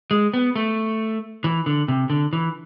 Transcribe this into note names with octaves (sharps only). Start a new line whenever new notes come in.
G#3
B3
A3
E3
D3
C3
D3
E3